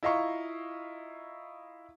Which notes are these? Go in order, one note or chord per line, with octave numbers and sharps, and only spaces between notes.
E4 F4 D#5 F5 A#5 C#6